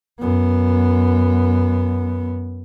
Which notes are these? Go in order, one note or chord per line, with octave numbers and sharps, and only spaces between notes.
F#2 B3